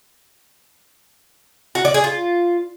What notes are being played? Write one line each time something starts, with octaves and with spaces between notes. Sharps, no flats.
F#4
D5
G#4
F4